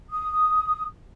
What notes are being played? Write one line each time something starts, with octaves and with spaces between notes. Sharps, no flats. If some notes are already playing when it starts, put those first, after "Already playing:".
D#6